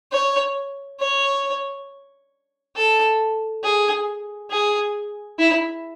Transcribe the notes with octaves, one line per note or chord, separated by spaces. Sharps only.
C#5
C#5
A4
G#4
G#4
E4